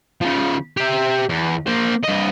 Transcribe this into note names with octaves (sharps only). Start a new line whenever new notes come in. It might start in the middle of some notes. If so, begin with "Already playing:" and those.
C#3 F3
G4 E5
E2
A#3 C5
G2 D#5